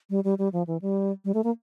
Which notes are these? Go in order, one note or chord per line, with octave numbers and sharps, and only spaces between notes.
G3
G3
G3
F3
E3
G3
G3
A3
A#3